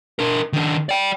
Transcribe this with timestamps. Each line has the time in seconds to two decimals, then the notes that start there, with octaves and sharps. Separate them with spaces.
0.19 D4 A#4
0.53 D#3 D4
0.89 D5 G5